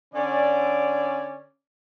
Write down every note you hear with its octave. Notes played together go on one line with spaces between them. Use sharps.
D3 C#4 D5